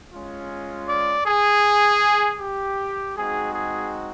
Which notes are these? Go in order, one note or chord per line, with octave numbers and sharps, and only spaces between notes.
G#3 C#4 F4
D5
G#4
G4
G#3 C4 D#4 F#4 G#4
G#4